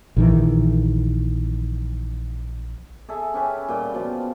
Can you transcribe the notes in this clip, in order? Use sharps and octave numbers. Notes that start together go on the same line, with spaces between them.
A#1 D#3 E3
G#4 A4 E5
C#4 G4 B4
A#2 G3 G5
B2 F3